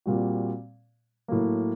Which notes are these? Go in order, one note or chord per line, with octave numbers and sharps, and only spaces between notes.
A#2 G3 C4 F#4
A2 F#3 A#3